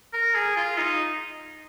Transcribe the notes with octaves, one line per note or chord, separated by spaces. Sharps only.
A#4
G#4
F4
D#4